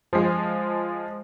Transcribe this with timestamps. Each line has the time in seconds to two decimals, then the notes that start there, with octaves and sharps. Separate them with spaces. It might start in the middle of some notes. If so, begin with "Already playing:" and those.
0.13 F3 G#3